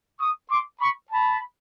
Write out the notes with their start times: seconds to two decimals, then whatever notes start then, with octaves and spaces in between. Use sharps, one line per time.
0.19 C#6 D#6
0.50 C6 D6
0.80 B5 C#6
1.11 A5 B5